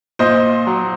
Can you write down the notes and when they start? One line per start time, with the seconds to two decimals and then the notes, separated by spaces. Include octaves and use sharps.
0.19 A#2 C5 D#5
0.67 F#3